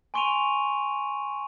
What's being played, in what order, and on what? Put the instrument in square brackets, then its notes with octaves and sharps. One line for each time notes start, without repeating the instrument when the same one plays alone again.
[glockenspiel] G#5 C6 C#6 D7 D#7 F7